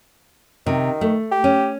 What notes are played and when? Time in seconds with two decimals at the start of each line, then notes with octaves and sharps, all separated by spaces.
0.66 C3 D#3
1.01 A3
1.32 G4
1.44 C#4